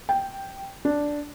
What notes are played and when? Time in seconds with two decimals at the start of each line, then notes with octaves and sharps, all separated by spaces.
0.09 G5
0.85 D4